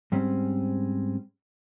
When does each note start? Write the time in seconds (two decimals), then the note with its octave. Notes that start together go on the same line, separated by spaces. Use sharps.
0.12 G#2 G3 C4 C#4